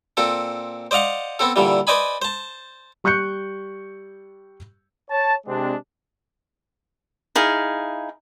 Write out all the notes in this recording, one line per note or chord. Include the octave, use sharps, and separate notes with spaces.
A#2 C4 A4
C5 D5 D#5 F5 F#5
B3 C4 A4
A#2 D3 E3 G3
B4 C5 D5 D#5 G#5 B5
C5 A5
G3 C#6 F#6 G6 C#7
C#5 A5
C3 G#3 C4 D4
D#4 E4 G#4 F5